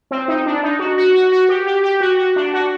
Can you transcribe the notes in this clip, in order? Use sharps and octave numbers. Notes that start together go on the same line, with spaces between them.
C4
D#4
D4
D#4
F#4
F#4
F#4
F#4
G4
G4
G4
F#4
F#4
D4
F#4